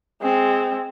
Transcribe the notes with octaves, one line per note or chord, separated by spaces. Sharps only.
G#3 C4